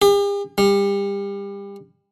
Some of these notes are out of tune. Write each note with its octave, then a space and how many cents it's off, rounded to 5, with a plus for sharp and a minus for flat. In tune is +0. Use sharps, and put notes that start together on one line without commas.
G4 +45
G3 +30